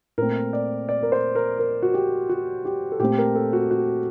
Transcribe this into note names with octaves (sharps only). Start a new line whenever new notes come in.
A#2 A3 C4 A#4
D5
D5
A#4
C5
A#4
A#4
F#4
G4
F#4
G4
A4
A#2 A3 C4 G4
A#4
A4
F#4
F#4